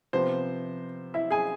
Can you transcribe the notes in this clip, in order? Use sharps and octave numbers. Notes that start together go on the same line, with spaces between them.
C3 F3 B3 C5
E4 E5
G#4 G#5